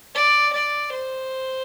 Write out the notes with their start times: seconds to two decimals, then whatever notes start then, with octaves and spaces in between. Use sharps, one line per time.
0.15 D5
0.53 D5
0.92 C5